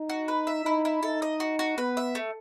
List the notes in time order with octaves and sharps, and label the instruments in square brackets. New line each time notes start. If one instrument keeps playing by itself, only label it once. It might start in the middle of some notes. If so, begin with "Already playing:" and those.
Already playing: [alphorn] D#4
[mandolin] F#4
B4
E5
[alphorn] D#4 [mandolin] E4
[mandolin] E4
[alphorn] D#4 [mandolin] A4
[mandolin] D#5
F#4
F#4
[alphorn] B3 [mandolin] B4
[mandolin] E5
A3